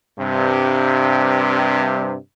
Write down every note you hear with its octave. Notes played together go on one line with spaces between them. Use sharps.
G2 C3